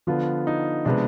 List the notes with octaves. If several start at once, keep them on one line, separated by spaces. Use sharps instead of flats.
D3 F3 B3 F4
D#4
C3 F3 G#3 B3 D4